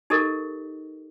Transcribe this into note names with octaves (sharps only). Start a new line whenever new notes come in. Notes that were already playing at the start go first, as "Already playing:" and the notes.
D#4 G4 A4 A#4 D#5